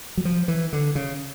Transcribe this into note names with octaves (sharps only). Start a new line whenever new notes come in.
F#3
F3
E3
D3
C#3